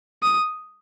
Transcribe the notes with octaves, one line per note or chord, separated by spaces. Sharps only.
D#6